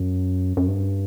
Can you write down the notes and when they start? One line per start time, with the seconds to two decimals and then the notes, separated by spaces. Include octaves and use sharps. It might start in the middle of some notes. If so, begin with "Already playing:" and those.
Already playing: F#2
0.57 F#2
0.68 G2